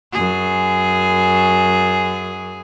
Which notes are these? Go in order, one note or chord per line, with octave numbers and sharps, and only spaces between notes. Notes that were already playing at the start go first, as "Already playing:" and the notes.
F#2 G#4